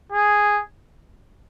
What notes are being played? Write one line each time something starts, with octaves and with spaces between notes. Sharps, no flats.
G#4